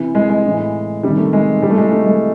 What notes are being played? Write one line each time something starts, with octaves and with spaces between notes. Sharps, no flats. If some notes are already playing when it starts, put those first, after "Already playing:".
Already playing: C3 E3
G#3
G#3
A2 E3
C3 D#3 G3
A3
G#3
C3 E3 G3
A3
G#3
A3
G#3